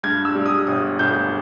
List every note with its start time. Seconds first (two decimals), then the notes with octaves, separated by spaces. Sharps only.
0.03 G2 G#6
0.25 E6
0.35 G3
0.46 D#6
0.67 G1 D#6
0.99 G1 G6